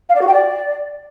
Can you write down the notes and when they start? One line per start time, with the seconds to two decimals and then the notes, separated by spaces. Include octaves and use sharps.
0.09 F5
0.15 D5
0.21 F#4
0.27 G5
0.33 D5